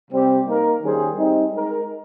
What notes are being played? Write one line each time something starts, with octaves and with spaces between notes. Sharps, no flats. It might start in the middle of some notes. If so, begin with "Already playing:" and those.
C3 G3 C4 G4
A#3 D#4 A#4
D#3 G3 C#4 G#4 C5
G3 C4 D#4
G#3 D#4 A#4